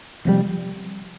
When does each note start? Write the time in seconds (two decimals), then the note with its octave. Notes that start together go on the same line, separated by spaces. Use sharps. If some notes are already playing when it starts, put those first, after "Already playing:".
0.25 F1 F2 C3 G3